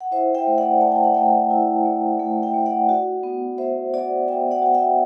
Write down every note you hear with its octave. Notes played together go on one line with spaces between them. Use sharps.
F#5
E4 C5 E5
E5 G5
A3
D5 F#5
A3 A5
G5
F#5
A3 E5 G5
E4
A3
A3
E5 G5
A3
D5 F#5
F#4
B3
B3 C5 E5
F#4 D5 F#5
B3 E5 G5
D5 F#5
F#4 F#5
E5 G5